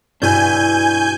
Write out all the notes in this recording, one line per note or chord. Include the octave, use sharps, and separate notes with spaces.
G2 B2 D4 E4 F#4 G#5 G6